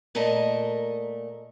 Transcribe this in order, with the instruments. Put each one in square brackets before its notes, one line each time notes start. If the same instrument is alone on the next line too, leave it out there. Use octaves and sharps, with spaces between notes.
[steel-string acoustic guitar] A#2 A3 A#4 D#5 A5